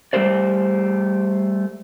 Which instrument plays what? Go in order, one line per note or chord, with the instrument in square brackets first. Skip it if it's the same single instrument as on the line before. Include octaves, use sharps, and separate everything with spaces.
[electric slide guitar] G3 A3 G4 C5 D5